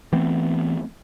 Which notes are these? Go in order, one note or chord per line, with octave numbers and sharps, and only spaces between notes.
E3 A3 B3 C4